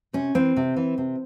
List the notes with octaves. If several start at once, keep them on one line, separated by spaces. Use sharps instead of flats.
C3 C#4
E3 C4
C3
E3
C3